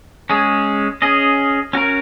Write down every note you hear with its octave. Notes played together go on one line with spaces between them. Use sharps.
G#3 C#4 G#4
C#4 G#4 D#5
C#4 F#4 A#4